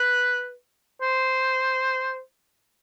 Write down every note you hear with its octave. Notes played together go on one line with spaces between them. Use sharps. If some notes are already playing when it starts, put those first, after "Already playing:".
Already playing: B4
C5